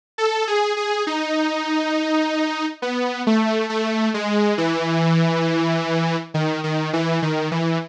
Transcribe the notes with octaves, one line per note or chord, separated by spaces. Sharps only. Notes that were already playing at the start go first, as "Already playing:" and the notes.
A4
G#4
G#4
D#4
B3
A3
A3
G#3
E3
D#3
D#3
E3
D#3
E3